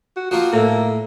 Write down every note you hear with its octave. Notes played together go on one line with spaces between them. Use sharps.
F#4
F3 A#3 F4 F#4
A2 A#3 A4